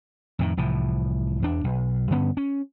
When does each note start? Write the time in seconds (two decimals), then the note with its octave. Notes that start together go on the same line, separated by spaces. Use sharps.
0.39 F2 A2 D#3
0.57 C2 A2 E3 F3
1.42 E2 D4
1.64 B1
2.11 G2 D3 B3 C#4
2.37 C#4